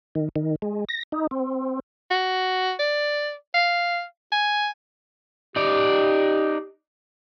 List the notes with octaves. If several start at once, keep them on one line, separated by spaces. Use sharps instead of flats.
D#3
D#3
G#3
A#6
D#4
C4
F#4
D5
F5
G#5
D#4 G4 D5